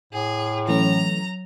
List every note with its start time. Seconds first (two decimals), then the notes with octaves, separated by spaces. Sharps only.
0.13 A2 G#4
0.68 E3 F#3 A3 C#4 A#5